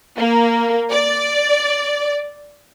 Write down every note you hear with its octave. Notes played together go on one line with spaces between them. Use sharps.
A#3
D5